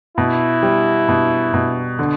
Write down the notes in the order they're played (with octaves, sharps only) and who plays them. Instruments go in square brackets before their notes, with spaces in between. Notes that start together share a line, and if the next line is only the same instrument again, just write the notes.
[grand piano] B2 [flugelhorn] E4
[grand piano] G3
B2
B2
D3